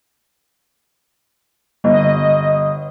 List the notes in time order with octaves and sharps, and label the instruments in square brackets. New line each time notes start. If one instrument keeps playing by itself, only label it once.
[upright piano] G1 [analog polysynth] D#5